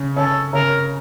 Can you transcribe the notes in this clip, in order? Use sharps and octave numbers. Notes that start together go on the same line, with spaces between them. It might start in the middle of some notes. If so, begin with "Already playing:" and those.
Already playing: C#3 C#4
C#3 C#4 A4
C#3 C#4 A#4